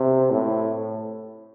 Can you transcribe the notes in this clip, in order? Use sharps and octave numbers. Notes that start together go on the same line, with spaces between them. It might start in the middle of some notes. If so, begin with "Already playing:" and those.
Already playing: C3
A2